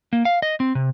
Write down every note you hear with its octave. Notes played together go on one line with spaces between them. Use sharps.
A#3
F5
D#5
C4
C3